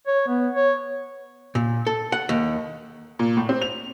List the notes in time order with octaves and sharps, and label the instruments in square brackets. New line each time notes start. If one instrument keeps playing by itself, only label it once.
[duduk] C#5
B3
C#5
[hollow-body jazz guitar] A#2
A4
F#5
D#2
[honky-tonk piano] A#2
A2
C4
F7